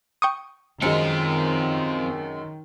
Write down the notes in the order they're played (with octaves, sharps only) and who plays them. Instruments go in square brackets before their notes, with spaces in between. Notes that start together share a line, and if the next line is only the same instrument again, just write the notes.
[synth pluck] G5 C#6 D#6
[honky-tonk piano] F#2 G#3 [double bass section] D#3 [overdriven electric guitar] C4 F4 [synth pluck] C#7